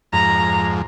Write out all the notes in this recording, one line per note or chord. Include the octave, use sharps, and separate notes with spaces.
F2 G#2 A#5